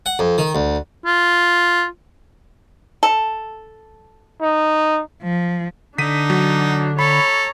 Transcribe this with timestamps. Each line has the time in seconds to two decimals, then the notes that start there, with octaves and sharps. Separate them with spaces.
0.06 F#5
0.19 F2
0.38 D#3
0.55 D2
1.06 F4
3.03 A4
4.41 D#4
5.23 F3
5.98 D3 D4 D#4 B6 D#7
6.30 F#3
6.99 A4 C#5 A#5 B5